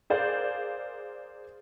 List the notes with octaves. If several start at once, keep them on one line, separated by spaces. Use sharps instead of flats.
G#4 A#4 C5 D5 F5